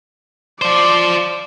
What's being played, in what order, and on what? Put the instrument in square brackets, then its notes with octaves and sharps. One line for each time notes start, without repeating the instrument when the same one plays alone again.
[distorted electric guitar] F3 C5 [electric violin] D5